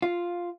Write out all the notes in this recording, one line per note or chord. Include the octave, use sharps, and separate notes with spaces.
F4